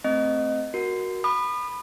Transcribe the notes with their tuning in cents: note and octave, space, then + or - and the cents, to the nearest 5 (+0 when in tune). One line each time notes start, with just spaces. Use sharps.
A3 +0 C4 +0 D#5 +0
F#4 +0 A#4 +10
B5 +0 D#6 -40